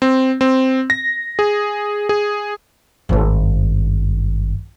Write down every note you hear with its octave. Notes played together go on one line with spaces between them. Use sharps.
C4
C4
A#6
G#4
G#4
G#1 G2